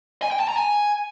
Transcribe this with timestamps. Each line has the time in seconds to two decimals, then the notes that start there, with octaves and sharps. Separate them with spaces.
0.22 G#5
0.31 G5
0.40 A5
0.48 A#5
0.57 G#5